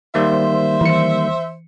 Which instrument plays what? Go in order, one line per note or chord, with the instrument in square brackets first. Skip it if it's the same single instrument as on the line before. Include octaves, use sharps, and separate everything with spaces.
[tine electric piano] D#3 G3 A#3 [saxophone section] C5 E5
[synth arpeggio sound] E3 C#7